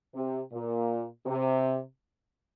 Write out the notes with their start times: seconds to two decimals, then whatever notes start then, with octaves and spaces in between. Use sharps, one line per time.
0.15 C3
0.52 A#2
1.26 C3